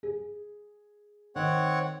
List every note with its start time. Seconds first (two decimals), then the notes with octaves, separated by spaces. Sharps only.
0.03 G#4
1.36 D#3 C4 C#5 F#5